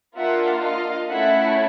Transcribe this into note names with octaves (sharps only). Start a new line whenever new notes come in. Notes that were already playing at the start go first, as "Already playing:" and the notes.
A#3 D4 F4 E5 F#5
D#5 F5
A3 C#4 E4 A4 E5 F#5